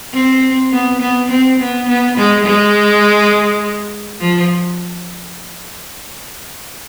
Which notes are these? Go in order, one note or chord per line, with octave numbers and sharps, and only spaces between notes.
C4
B3
B3
C4
B3
B3
G#3
G#3
F3